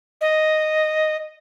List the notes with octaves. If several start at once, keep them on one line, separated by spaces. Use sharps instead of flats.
D#5